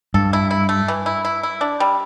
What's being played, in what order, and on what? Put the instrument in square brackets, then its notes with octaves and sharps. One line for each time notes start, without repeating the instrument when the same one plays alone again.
[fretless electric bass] G2 [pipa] A4
[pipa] E4
E4
A3
E3
E4
E4
E4
D4
G3